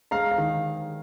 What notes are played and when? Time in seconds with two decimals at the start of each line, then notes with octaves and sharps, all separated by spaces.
0.11 G#3 F5 A#5
0.31 F5
0.38 D#3